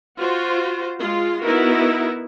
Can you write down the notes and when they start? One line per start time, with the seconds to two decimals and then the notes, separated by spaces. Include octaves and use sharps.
0.22 F4 F#4 C5
0.99 G#3 F4
1.43 B3 D#4 E4 F#4 A#4